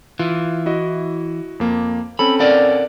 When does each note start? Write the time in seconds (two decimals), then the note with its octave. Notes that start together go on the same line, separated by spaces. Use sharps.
0.19 E3 F4
0.66 E4 F#4 D#5
1.60 F2 A#3
2.19 C4 C#4 A4 B5
2.40 A#4 D5 F#5